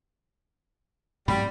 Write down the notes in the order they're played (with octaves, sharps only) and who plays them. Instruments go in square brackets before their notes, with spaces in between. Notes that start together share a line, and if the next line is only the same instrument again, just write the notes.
[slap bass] G#2 B2 F#3 [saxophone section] G3 [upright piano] B5